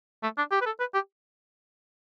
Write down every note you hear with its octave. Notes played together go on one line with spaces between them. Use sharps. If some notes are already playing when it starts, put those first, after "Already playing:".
A3
D4
G4
B4
A4
B4
G4